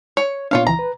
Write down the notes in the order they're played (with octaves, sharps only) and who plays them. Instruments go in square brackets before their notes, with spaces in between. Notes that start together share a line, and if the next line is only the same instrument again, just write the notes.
[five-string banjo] C#5
[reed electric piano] A#2 B3 D4 [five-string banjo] F4 C#5 F5
[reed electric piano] C#2 E3 [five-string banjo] A#5
[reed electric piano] B4